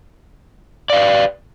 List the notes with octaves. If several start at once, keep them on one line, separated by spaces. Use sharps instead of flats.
B4 D5 F5